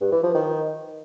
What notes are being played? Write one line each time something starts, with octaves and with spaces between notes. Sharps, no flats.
G2
E3
F3
D#3